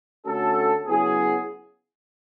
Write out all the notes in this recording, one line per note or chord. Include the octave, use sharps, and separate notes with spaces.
D3 A3 C#4 F#4 A4
C#3 F#3 B3 E4 G#4